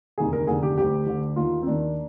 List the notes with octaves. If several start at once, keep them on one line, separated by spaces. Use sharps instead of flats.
F1 D#2 D3 G#4
A#4
F1 D#2 D3 G#4
G4
D2 D3 G4
D2 D3
D#2 D#3 F4
C4
D#2 D#3 D4